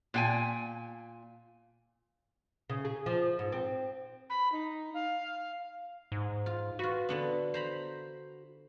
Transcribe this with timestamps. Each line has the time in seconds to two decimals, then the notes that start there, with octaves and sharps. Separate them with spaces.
0.14 A#2 G5 G#5
2.70 C#3
2.85 G#4
3.06 F3
3.39 G#2
3.52 C4
4.30 B5
4.52 D#4
4.94 F5
6.12 G#2
6.46 F4
6.79 F4 F#4 B4
7.09 D3 B3 D4
7.54 C5 A#5 B5